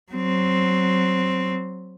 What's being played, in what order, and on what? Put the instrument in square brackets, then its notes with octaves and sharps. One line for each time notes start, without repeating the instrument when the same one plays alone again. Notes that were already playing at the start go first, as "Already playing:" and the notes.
[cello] F#3 C4